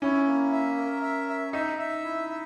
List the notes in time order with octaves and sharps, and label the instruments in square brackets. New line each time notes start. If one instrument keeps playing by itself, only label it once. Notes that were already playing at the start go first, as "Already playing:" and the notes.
[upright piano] C#4 [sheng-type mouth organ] E4
[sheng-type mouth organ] A#3
E5
A#4
E5
E5
[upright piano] D#4 [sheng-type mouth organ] E5
[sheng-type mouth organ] E5
E4
E5